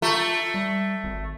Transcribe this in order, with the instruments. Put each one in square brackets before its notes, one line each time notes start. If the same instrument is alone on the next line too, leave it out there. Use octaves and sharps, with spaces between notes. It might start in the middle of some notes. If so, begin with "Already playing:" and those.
[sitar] A3 [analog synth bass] F4
[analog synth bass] G3
G#1